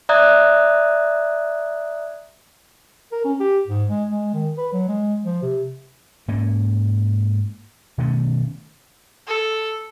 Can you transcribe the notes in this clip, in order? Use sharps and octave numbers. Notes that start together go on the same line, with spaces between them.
D5 E5 A#5 D#6 F#6 G#6
A#4
C#4
G4
G#2
G#3
G#3
D#3
B4
F#3
G#3
F3
C3
G#2 A#3 C#4
B2 D#3 A3 C#4
A4